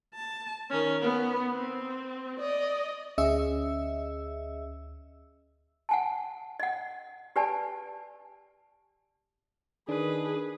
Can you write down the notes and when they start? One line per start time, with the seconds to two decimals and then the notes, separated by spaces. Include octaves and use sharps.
0.14 A5
0.70 D#3 C#4
1.02 B3
1.53 C4
2.40 D5 D#5
3.18 D2 C#4 G#4 D#5 E5 E6
5.89 F#5 G#5 A5
6.60 D#5 F#5
7.36 G4 B4 D5 G#5 A5
9.89 D#3 D4 G#4 B4